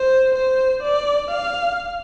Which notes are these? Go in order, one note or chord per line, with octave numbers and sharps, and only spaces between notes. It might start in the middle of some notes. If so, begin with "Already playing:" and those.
Already playing: C5
C5
D5
F5